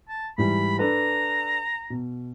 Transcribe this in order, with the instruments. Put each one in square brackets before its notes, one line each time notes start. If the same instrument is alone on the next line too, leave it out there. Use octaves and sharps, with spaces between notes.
[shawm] A5
[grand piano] G#2 E3 G3 [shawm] B5
[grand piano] D4 A4 B4 [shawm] A#5
[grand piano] B2